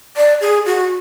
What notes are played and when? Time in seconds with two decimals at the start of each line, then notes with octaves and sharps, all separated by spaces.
0.17 D5
0.41 G#4
0.66 F#4